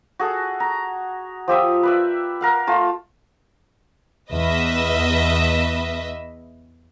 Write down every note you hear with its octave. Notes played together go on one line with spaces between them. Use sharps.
F#4 G#4 A4
A#5
F3 G4 E5 D#6
B4 D5 E5
A#4 F5 F#5
A3 F4 A5
E2 B4 D#5 E5